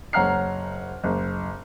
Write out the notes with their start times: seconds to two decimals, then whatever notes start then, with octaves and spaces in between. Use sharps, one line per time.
0.13 F#1 C#5 F#5 A#5 F6 C7
1.04 F#1